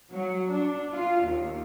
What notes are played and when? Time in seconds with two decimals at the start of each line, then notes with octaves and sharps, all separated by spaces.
0.14 F#3
0.52 D4
0.93 F4
1.25 D#2